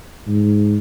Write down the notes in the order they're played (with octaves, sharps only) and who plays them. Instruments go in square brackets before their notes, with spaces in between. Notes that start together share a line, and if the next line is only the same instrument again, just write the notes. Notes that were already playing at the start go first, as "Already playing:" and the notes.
[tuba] G#2